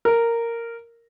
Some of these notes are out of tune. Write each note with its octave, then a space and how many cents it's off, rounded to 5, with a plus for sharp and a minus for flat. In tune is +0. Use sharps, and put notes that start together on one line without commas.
A#4 -10